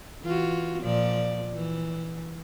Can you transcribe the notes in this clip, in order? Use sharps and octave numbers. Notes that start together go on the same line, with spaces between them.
E3 F4 F#4
A#2 F3 D5
E3